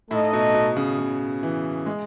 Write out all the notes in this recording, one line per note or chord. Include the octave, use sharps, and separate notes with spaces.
A2 A3 D#4 A4 D#5
B2
B2
C#3
C#3
E3
G#3